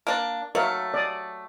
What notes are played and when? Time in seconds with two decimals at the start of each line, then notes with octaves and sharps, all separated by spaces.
0.07 A#3 D4
0.55 F#3 A3 A#4 E5 F5
0.94 D5 D#6